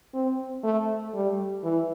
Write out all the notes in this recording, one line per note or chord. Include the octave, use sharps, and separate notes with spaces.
C4
A3
G3
E3